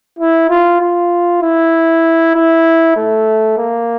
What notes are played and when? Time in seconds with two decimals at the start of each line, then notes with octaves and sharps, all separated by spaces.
0.19 E4
0.50 F4
0.80 F4
1.42 E4
2.35 E4
2.97 A3
3.58 A#3